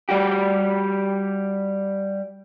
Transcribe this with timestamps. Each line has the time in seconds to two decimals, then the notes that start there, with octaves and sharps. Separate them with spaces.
0.09 G3 F#4 G4